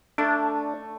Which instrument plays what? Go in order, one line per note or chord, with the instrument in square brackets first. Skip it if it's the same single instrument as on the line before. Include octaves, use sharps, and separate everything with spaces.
[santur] A3 [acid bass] D4